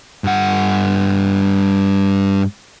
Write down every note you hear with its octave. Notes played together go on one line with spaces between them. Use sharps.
G2 F#5